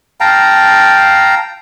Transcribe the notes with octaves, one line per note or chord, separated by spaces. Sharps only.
F5 G5 A5 A#5